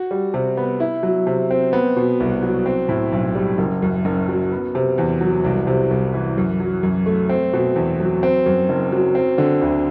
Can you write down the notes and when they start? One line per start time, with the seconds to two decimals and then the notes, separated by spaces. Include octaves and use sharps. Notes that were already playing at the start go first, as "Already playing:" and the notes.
Already playing: F#4
0.11 G3
0.34 C3
0.57 B3
0.80 E4
1.03 F#3
1.27 C3
1.51 C4
1.73 B3
1.96 B2
2.20 C2
2.43 F#3
2.66 C4
2.89 A2
3.12 B1
3.35 G3
3.58 F#1
3.82 F#2
4.05 F#1
4.28 F#3
4.52 B3
4.75 C3
4.98 E2
5.21 F#3
5.44 C2
5.67 C3
5.90 C2
6.14 E3
6.38 F#2
6.60 F#3
6.83 F#2
7.06 A3
7.29 C4
7.53 B2
7.76 E2
8.00 F#3
8.23 C4
8.46 F#2
8.69 F#1
8.92 F#3
9.15 C4
9.38 D3
9.61 D2